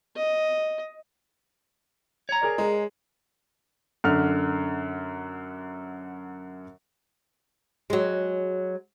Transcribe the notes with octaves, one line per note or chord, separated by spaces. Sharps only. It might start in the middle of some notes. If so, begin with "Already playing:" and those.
D#5
C#5 A#5
G#4 A#4 D5
G#3
F#2 D3 F6
F#3 G#3